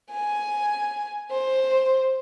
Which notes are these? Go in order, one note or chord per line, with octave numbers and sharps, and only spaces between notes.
G#5
C5